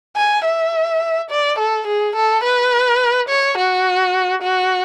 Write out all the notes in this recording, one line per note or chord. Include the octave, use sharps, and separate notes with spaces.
G#5
E5
D5
A4
G#4
A4
B4
C#5
F#4
F#4